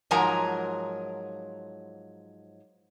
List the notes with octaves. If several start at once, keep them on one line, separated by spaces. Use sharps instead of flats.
G#2 F3 F#3 A#4 G#5 A#5